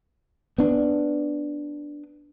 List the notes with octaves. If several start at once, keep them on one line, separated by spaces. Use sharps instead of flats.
B3 D4